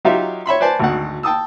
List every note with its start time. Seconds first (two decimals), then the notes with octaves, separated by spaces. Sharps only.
0.05 F#3 D#4 F4 G4 E5 F5
0.46 C#5 E5 B5 C6
0.60 B4 C5 D5 G#5 A5
0.79 G#1 D2 F#5
1.23 G5 A5 D#6 E6